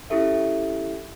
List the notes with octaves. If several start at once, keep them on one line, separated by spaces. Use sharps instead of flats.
C#4 E4 G4 A4 E5